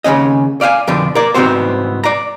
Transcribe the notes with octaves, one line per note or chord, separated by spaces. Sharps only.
D#2 C#3 F#3 C#4 D#5
D5 F5 F#5 G#5
F2 B2 D3 F3 D4
A#4 D5
C2 G#2 B3 C4 F#4 C5
D5 A#5